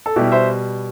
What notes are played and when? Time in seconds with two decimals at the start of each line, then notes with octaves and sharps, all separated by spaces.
0.06 A4
0.16 B2 G3 E4 G4
0.32 C5 E5